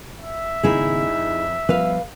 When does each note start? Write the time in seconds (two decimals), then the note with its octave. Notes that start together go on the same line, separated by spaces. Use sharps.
0.19 E5
0.63 G#1 C#3 B3 D#4 E4 G#4
1.06 F2
1.69 F3 G3 B3 B4 F5